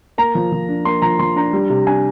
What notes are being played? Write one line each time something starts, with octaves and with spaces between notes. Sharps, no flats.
A#3 A#5
F3
F3
D4
A#3 C6
F3 A#5
F3 C6
D4 A#5
G3
C3
D4 G#5